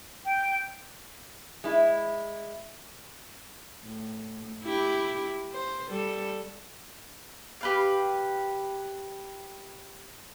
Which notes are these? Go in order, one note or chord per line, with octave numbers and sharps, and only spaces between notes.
G5
G#3 E4
A2
E4 G4
C5
G3 A4
G4 B4 F5